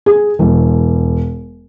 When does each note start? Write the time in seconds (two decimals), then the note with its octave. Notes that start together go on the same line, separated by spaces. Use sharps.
0.06 G#4
0.39 E1